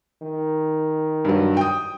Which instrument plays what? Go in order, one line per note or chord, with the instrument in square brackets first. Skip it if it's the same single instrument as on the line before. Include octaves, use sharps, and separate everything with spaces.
[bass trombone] D#3
[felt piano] G2 F#3
G5 D#6